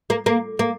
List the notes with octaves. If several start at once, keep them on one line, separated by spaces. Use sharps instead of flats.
A#3
A#3
A#3